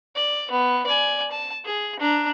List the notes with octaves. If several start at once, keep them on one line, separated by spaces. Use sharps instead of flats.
D5
B3
D5 G#5
A5
G#4
D4 A#5